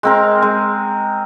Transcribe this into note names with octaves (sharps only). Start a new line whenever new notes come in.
G#3 C4 A#4
G#3